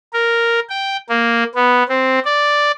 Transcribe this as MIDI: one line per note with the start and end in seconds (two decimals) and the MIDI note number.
0.14 0.60 70
0.69 0.97 79
1.09 1.44 58
1.55 1.83 59
1.89 2.19 60
2.25 2.71 74